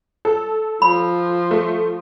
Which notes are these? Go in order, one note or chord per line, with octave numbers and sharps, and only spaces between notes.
A4
F3 B5
A3